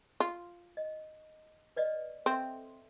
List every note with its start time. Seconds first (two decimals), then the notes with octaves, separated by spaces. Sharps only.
0.20 F4
0.77 D#5
1.76 B4 D5 D#5
2.26 C4 A4 E5 C6